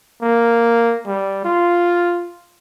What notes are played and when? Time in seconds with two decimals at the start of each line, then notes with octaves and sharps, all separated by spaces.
0.22 A#3
1.06 G3
1.44 F4